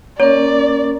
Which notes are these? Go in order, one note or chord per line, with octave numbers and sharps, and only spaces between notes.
A#3 C#4 A#4 C#5 D5